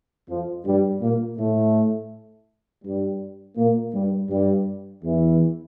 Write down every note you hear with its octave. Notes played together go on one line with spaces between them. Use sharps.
F2 F3
G2 G3
A#2 A#3
A2 A3
G2 G3
A#2 A#3
G2 G3
G2 G3
E2 E3